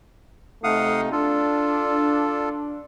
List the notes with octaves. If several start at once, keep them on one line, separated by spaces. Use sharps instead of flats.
C3 A3 D#4 F5 F#5 D#6
D4 F4 A4